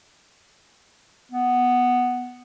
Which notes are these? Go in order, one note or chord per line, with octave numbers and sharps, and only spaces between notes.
B3